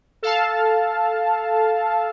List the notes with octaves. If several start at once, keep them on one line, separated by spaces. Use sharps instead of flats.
A4 F5 A5